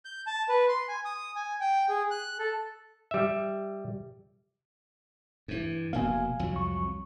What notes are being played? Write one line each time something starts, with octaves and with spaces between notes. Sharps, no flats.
G6
A5
B4
C6
G#5
D#6
G#5
G5
G#4
F#6
A4
G3 E5
G2 E3
F1 B2 A#3 F5 G#5
C2 F2 F#3
C#6